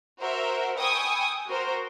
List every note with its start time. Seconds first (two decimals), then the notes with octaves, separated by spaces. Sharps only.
0.21 F#4 A#4 C5 E5
0.80 G5 G#5 B5 C#6 D#6 E6
1.48 F#4 A#4 C5